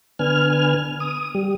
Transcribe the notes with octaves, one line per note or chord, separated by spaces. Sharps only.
D3 B3 G#5 F6
D#6
G3